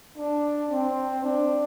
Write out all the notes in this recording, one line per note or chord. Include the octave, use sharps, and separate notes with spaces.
D4
C4
D4